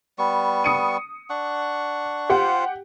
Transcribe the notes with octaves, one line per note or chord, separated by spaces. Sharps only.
G3 B3 C#6
D#6 C#7 D#7
D4 F#5 C#6
F4 G4 C5 F#5